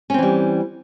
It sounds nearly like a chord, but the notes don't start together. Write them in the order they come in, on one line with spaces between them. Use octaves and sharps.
C#4 C4 E3 G3